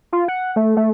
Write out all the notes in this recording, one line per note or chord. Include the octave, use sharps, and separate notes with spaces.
F4
F#5
A3
A3